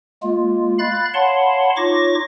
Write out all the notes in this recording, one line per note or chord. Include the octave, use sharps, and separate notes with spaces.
G#3 A#3 F4
F5 B5 F#6 A6
C#5 F5 F#5 A5 B5 C6
D#4 F4 C#5 C#6 D6 A#6